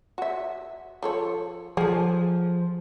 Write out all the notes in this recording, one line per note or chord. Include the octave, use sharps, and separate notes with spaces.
F#4 E5
F3 A4 C#5
F3 G#4 A4